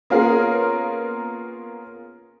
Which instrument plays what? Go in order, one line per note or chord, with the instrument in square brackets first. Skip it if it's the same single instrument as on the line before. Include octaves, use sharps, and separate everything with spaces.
[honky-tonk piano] A#3 B3 C#4 F4 G#4 A#4